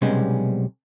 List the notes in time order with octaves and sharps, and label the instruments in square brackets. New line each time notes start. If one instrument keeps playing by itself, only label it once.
[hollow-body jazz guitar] B1 C3 G3 G#3 B3 C#4